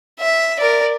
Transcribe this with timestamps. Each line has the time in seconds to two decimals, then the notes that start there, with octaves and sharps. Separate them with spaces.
0.19 E5
0.60 A#4 D5